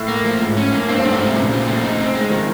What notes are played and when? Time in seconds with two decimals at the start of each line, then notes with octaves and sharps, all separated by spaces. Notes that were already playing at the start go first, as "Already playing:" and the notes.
Already playing: A2
0.08 A#3
0.24 F3
0.41 G#2
0.57 C#4
0.72 A#3
0.88 G2 C4
1.00 G2 A3
1.12 G#2
1.19 C3 F3
1.35 A#2 C#3
1.51 C4
1.68 A3
1.83 D#4
1.98 C4
2.15 G#3
2.30 D#3 F3